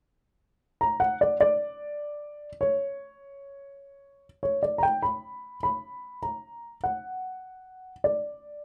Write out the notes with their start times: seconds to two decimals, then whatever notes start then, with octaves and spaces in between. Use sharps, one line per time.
0.81 A#5
1.00 F#5
1.21 D5
1.40 D5
2.61 C#5
4.43 C#5
4.63 D5
4.78 A#5
4.83 G5
5.03 B5
5.63 B5
6.23 A#5
6.84 F#5
8.04 D5